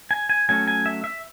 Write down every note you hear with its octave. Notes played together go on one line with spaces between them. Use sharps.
G#5
G#5
F#3 A3 C#4 G#5
G#5
E5
E5